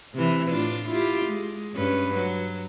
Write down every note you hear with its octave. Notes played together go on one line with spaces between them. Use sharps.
C3 E3
A2 D4 F4
E4 F4 G4
G#3
G2 C#4 B4
F#3